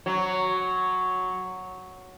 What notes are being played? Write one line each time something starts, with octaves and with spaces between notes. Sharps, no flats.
F#3